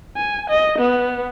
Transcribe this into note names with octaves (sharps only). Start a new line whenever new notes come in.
G#5
D#5
B3